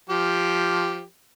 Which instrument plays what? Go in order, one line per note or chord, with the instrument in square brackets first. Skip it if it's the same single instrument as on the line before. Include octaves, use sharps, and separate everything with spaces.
[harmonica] F3 G4